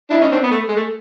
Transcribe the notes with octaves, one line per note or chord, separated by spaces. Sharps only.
D4 E4
C#4 D#4
C4 D4
B3
A3
G#3
A3